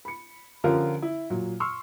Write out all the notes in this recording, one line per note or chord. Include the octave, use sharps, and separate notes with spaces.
B5 C#7
D3 F3 C#4 F4 G4 A#4
E4
A#2 F#3
C6 C#6 E6 F6